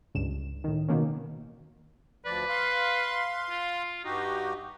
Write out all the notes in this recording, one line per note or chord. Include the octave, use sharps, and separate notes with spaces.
C#2 G2 E7
A2 D#3
B2 D#3 A#3 C#4
D2 F3 B4 D5
F5 C6
F4
G2 D#4 F#4 G4